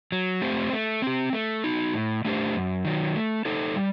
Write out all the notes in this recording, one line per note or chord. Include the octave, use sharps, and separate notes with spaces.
F#3
A3 C4 G4 C5
A3
C4 G4
A3
D#4 F#4
A2
A3 D4 G4 C5
F#2
D#3 F#3
A3
D#4 A4 C5
G3